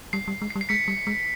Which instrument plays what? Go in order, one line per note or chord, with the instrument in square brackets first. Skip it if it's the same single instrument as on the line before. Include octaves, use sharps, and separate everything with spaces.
[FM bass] G3 [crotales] C7
[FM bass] G3
G#3
[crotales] C7
[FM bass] G3
[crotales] C7
[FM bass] G#3 [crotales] B6 C#7
[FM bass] G3
G#3